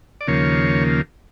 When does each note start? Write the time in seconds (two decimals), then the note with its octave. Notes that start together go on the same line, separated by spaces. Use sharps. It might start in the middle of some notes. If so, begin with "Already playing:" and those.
0.21 D5
0.27 D#2 C#3 F3 A#3 C#5